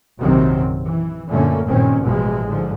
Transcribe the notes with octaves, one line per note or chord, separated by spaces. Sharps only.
A#1 F#2 C3 D#3 F#3 C4
E3
F#2 A#2 D3 A3 A#3 C#4
F#1 G2 A#2 D#3 C4 C#4
A1 B2 E3 F3 G#3
G#2 D3 F3